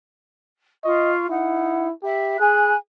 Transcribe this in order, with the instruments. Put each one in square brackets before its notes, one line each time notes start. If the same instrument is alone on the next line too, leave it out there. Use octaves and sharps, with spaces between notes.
[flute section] F4 C#6 [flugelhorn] D#5
[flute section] D#4 F#5 [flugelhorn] E4
[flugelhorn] G4 [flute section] E5 B5
[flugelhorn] G#4 [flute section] G#5 B5 F#6